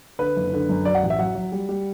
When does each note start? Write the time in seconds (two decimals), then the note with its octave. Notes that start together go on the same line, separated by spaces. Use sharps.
0.19 D3 B4
0.36 F#1
0.53 D3
0.69 F#2
0.85 F#3 D5
0.95 F#5
1.03 A1
1.10 E5
1.18 F#3 F#5
1.35 F#3
1.52 G3
1.69 G3